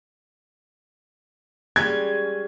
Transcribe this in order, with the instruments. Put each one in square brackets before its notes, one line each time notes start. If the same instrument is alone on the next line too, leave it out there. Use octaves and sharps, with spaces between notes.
[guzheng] G3 G#3 C#4 [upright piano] G#6